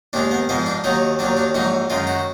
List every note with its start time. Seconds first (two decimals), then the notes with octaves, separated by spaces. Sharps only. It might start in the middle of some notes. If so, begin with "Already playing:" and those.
0.13 D#2 D#3 G#3 D4
0.31 B3
0.49 G#2 F3 G#3 B3
0.66 D4
0.84 D#2 D#3 F#3 D#4
1.19 D#2 D#3 F#3 D4
1.37 D4
1.54 A#1 G#2 F#3 D#4
1.90 F#2 D#3 G#3 F4
2.07 F#4